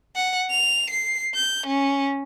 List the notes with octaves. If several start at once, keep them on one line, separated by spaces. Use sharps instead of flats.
F#5
F7
C7
G6
C#4